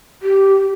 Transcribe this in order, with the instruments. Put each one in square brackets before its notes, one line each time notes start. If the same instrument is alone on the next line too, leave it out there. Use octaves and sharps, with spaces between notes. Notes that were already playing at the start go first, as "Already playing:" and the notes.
[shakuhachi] G4